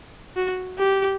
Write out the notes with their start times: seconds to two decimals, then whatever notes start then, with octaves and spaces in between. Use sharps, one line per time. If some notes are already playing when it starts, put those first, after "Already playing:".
0.36 F#4
0.79 G4